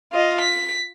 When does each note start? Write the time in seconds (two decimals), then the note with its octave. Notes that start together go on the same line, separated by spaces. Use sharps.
0.12 F4 D#5
0.41 B6